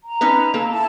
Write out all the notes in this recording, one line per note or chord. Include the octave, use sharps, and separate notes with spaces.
A#5
C#4 D#4 B4
A#3 A4
E4 A5